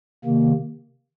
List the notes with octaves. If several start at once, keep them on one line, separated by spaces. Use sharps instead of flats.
C3 D#3 A#3